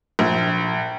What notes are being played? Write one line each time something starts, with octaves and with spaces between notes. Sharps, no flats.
A#1